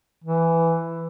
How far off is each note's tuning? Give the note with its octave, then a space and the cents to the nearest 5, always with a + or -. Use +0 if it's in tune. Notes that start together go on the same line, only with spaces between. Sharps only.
E3 +10